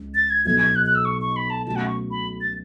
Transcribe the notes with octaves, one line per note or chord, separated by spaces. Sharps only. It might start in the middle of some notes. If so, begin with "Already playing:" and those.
Already playing: C#2 G#3
A6
G#6
B1 B2 F#3 G#6
G#6
F#6
F#6
E6
C#6
C#6
B5
A5
B2 F#3 A3 C#4 F#4 A5
F#5
C#6
B5
A6